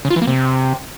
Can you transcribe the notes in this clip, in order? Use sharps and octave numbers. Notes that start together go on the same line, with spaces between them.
C#3
F4
E3
A#3
C3